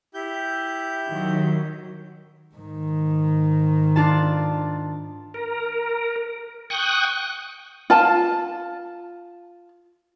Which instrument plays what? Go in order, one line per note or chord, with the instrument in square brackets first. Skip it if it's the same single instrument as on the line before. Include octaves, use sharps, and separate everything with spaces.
[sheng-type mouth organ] E4 G4 G6
[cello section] D#3 F#3
[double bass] G#2 D#3
[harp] D4 F4 A5
[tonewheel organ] A#4
G5 C#6 D#6 F#6
[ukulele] F4 A5